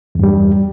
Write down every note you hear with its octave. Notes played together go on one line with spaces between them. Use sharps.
E2 G2 G3